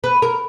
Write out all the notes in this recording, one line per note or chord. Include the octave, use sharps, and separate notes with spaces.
B4
A#4